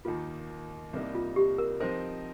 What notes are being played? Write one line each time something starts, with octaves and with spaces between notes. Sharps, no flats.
D#2 D#3 A#3 F4
C2 C3 G3 A#3 D#4
F4
G4
A#4
F3 C4 D#4 A#4 C5 D#5